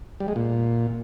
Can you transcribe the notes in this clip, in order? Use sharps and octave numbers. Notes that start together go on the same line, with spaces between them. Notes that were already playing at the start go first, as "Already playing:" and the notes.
G3
G#3
A#2